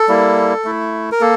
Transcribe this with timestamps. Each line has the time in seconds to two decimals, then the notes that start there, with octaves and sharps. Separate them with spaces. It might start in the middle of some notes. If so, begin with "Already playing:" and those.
Already playing: A4
0.08 G3 A#3 E4
0.64 A3 E4
1.12 A#4
1.21 A#3 A4